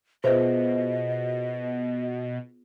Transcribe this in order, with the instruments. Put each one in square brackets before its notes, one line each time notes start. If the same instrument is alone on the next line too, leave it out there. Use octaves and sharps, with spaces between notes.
[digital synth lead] B2 [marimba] B3 F4 G#4 [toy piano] B4 C5 E5 [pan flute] D#5